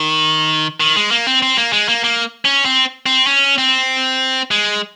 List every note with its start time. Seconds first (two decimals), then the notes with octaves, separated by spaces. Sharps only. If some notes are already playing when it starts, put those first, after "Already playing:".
Already playing: D#3
0.80 D#3
0.96 G#3
1.11 A#3
1.27 C4
1.42 C4
1.57 A#3
1.73 G#3
1.89 A#3
2.04 A#3
2.45 C#4
2.65 C4
3.06 C4
3.27 C#4
3.58 C4
4.51 G#3